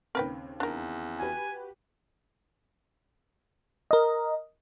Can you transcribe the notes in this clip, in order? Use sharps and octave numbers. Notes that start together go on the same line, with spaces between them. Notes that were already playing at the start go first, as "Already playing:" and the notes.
D#2 C#3 C4 A#4 B4 G5
E2 D4 A#4
F#4 G4 B4 G#5
A#4 D#5